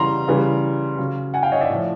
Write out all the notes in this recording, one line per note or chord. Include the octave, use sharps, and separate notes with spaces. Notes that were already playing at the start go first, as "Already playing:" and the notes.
Already playing: C#3 E3 G3 A#5 C6
C#3 E3 G3
C#3 F#3
F#5 G#5
F5 G5
C#5 D#5
D5 E5
A2 F3